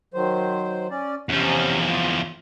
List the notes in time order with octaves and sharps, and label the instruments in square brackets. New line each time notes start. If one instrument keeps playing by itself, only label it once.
[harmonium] D#3 F#3 C5
C#4 D5
[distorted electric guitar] E2 F3 [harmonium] C3 C#4
[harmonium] F4